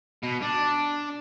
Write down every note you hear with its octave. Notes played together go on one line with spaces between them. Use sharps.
B2
D4